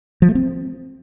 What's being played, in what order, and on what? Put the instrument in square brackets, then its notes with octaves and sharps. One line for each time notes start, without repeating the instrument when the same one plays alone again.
[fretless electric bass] F3
A3
C4